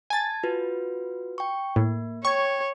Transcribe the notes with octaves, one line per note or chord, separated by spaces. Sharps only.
G#5 A5 G#6 A6
F4 F#4 B4
G5 C#6
A2 A#3
C#5 G5 C#6 G#6